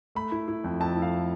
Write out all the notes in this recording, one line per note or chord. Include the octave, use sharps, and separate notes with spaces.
A3 B5
E4
E4
F2
F2 A5
E4
F5